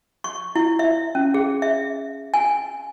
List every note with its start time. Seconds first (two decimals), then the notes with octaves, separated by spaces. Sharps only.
0.24 C#6
0.55 E4
0.79 E5
1.15 C#4
1.34 G#4
1.62 E5
2.34 G#5